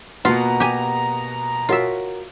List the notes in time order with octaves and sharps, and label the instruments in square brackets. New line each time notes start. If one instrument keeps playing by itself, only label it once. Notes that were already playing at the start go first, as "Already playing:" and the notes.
[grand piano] B2 B3 [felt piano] A#3 F#4 B4 [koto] F4 [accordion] A#5
[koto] G4 G#5
[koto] F4 E5 [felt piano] F#4 A#4 C#5